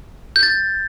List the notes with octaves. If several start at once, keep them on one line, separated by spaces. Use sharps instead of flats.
G6
A6